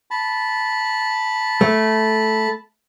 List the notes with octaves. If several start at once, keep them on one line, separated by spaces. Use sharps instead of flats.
A5 B5
A3